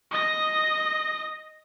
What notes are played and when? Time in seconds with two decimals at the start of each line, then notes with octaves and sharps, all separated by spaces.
0.11 D#5 A#6